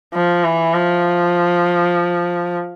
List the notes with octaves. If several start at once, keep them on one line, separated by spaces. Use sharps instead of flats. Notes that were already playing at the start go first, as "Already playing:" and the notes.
F3
E3
F3